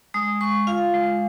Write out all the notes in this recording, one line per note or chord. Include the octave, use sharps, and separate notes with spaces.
G#3 D#6
G#3 C#6
F4 F5
G#3